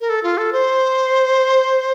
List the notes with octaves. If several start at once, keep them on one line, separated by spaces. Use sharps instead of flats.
A#4
A4
F4
A4
C5